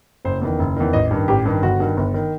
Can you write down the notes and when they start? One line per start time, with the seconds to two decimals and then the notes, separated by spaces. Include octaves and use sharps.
0.25 F#1 C5
0.42 E2 D#3
0.59 F#1
0.76 E2 D#3
0.93 A1 D#5
1.11 G2 D#3
1.28 A1 G4
1.45 G2 D#3
1.62 G1 F#4
1.80 G2 D#3
1.97 G1
2.14 D#3